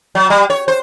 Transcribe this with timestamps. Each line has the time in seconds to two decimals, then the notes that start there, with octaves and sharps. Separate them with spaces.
0.15 F#3
0.30 G3
0.50 C#5
0.68 C5